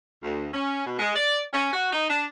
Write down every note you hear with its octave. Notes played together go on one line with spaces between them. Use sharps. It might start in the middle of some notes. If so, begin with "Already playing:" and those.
D2
C#4
B2
G#3
D5
C#4
F#4
D#4
D4